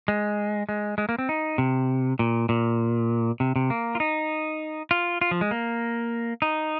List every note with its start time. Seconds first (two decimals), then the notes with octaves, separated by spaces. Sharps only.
0.08 G#3
0.69 G#3
0.98 G#3
1.09 A#3
1.19 C4
1.29 D#4
1.58 C3
2.19 A#2
2.49 A#2
3.40 C3
3.56 C3
3.70 A#3
3.95 F4
4.00 D#4
4.91 F4
5.21 F4
5.31 F3
5.41 G#3
5.51 A#3
6.42 D#4